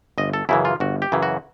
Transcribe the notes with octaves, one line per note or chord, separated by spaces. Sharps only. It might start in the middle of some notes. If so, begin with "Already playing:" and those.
G1 D#5
A4
F#2 C#3 E3 E4
F4
G1 F#4
G4
F#2 C#3 E3
F#4